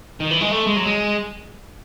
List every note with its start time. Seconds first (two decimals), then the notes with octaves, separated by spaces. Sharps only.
0.20 D#3
0.31 E3
0.41 G#3
0.51 A3
0.67 G#3
0.76 F#3
0.86 G#3